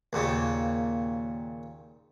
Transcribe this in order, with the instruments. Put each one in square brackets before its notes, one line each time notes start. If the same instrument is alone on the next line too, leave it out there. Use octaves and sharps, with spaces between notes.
[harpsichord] D#2 A#2 C#3